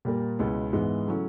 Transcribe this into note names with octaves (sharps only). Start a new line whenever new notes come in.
A#2 G3 A#3
C#2 B2 G#3 B3 E4
G#2 E3 G#3 B3
C#3 F#3 A3 C#4 E4